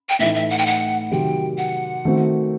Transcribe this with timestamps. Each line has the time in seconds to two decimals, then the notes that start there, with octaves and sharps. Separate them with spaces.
0.09 G5
0.19 A2 E3 A3 D#4 E5
0.35 E5
0.50 F#5
0.58 G5
0.66 F#5
1.11 C3 D#3 F#3 G5
1.58 F#5
2.05 D#3 A3 C4 F#4